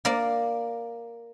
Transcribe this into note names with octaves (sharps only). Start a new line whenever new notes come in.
A#3 A#4 D5